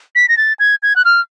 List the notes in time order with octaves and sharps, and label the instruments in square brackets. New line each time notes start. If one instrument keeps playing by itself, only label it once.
[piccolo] B6
A#6
A6
G#6
G#6
F#6
F6